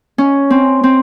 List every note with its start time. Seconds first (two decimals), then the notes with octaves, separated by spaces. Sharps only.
0.18 C#4
0.50 C4
0.84 C4